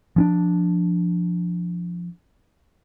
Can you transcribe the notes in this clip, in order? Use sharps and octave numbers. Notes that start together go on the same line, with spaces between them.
F3 C#4 D4